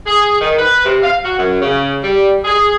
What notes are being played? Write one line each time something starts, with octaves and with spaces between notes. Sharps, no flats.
G#4
D#3
B4
C3
F5
F#4
F#2
C#3
G3
G#4